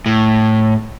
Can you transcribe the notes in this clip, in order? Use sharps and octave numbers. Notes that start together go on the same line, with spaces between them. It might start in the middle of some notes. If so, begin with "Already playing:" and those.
A2